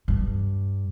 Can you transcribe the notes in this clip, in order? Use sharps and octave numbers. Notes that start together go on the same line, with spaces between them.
G2